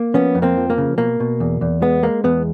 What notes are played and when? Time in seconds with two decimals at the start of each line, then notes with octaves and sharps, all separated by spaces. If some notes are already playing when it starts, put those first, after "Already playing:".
Already playing: A#3
0.14 F3 B3 C#4
0.35 F2
0.42 A#3 C4
0.57 F3
0.70 A#3
0.78 C#3
0.98 B2 A#3
1.20 B2
1.40 E2
1.61 E2
1.82 G#3 B3
2.03 G#3 A#3
2.24 E2 B3